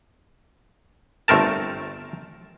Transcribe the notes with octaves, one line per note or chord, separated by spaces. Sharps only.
G1 A3 C4 A#4 A5